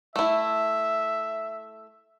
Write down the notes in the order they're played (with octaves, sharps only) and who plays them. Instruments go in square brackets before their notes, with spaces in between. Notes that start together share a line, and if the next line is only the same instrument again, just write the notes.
[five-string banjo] A3 E4 [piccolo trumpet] E5